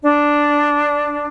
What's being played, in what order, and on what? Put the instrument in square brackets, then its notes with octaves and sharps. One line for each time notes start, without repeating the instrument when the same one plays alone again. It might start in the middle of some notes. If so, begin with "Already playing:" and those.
[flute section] D4